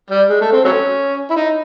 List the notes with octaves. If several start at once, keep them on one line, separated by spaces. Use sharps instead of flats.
G3
G#3
A3
C4
F#3 A3 C#4
E4
D#4